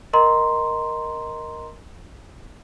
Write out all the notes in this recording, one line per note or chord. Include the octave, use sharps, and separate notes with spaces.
A#4 D#5 A#5 C6